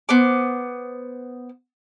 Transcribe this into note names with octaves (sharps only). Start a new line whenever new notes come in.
B3 C5 D6